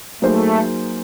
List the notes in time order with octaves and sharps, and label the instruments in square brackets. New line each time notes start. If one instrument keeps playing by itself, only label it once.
[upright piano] F#3 A#3 D#4 G#4 C5 [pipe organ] A3